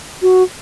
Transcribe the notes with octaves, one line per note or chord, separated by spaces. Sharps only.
F#4